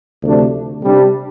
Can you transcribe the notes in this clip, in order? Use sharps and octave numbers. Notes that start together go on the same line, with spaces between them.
D2 C3 F3 A3 D4
C3 G3 D4